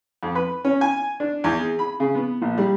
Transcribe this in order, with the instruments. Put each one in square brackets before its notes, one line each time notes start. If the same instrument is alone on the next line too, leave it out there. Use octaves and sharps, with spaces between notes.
[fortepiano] F2
B4
C#4
G#5
D4
E2
G#4
B5
C#3
B3
A#1
G3